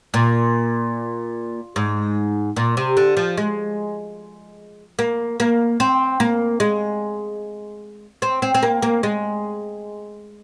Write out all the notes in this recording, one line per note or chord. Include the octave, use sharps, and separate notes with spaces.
A#2
G#2
A#2
C3
D3
F3
G#3
A#3
A#3
C4
A#3
G#3
C4
C4
C4
A#3
A#3
G#3